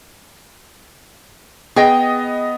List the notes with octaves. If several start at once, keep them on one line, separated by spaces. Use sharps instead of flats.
B3 G#4 D#5 G5 A#6